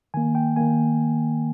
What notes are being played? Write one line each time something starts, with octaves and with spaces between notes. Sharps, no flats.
D#3 A#3 G#5
G5
D#3 A#3 G#5